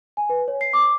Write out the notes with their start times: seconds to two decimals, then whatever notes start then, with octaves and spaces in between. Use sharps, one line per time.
0.17 G#5
0.30 B4
0.48 C#5
0.61 C7
0.73 D6